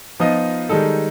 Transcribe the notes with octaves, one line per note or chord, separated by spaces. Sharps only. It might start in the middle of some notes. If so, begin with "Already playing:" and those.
F3 B3 D#4 F4 D#5
D#3 G3 G#3 D#4 A4